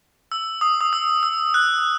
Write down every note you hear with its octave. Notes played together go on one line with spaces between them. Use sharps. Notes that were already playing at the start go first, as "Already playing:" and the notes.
E6
D#6
D#6
E6
E6
F#6